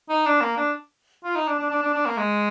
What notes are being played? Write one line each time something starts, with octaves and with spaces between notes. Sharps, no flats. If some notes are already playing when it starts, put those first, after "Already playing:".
D#4
D4
A#3
D4
F4
D#4
D4
D4
D4
D4
D4
A#3
G#3